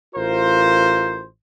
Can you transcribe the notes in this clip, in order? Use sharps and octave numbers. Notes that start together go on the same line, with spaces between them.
A1 F4 A#4 C5